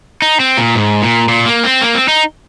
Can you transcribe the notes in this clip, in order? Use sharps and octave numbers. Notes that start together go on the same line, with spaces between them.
D#4
C4
A#2
G#2
A#2
A#2
A#3
C4
A#3
C4
D#4